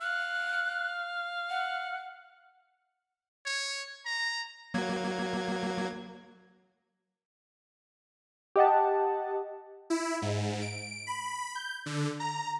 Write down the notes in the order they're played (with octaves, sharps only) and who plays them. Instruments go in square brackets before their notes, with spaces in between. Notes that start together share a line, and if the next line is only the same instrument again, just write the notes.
[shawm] F5 [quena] F#6
[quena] F#5
[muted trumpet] C#5
A#5
[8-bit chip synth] F#3 A#3 G#6
[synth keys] G4 D#5 F#5 A5
[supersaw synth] E4
G#2
D7
B5
G6
D3
A#5